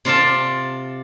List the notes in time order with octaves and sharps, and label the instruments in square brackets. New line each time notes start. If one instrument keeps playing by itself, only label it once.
[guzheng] C3 F4 D5 A5